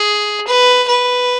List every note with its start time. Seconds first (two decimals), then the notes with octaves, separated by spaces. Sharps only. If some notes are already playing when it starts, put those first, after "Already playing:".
Already playing: G#4
0.47 B4
0.88 B4